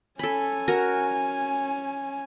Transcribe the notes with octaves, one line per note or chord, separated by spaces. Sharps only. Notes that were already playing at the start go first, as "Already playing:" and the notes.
C#4 A4 G#5 B5
F#4 A#4